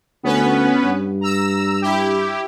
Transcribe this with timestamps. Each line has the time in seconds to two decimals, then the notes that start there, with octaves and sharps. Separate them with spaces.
0.24 D2 B3 C#4 B4
0.83 G2
1.21 A#5 E6
1.82 E4 G4